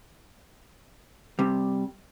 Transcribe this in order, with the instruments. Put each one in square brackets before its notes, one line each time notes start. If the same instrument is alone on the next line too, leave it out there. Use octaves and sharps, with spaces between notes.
[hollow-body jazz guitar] C3 G3